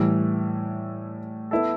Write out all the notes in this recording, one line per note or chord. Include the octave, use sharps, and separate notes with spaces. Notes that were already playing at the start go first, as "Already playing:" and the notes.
Already playing: A2 E3 G3
B3 E4 A4